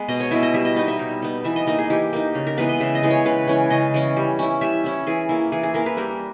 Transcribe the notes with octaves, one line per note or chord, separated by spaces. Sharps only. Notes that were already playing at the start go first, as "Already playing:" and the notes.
Already playing: G#3 B3 B4
B2 D#5
C#5
G#3 B3 E4 E5
D#5
G3 E5
D#5
B3 D#4 D#5
E5
G3
B3 D#4
E3 E5
D#5
A#3 D#4 D#5
G#4
E3 G4
A#3 D#4
C#3
A#4
E3 G#3 B3 B4
D#5
C#3 E5
D#5
E3 G#3 B3
C#5
C#3 B4
E3 G#3 C#4 C#5
C#3 D#5
E3 G#3 C#4
G3
C#4 E4
G3 E5
C#4 E4
E3 G#4
A#3 E4
E3 G#4
G#4
A#3 E4 A#4
B4
G3 A#4